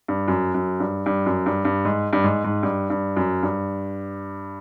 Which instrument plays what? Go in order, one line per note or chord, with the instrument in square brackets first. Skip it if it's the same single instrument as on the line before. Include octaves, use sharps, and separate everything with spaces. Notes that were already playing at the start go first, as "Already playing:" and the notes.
[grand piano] G2
F#2
F#2
G2
G2
F#2
G2
G2
G#2
G2
G#2
G#2
G2
G2
F#2
G2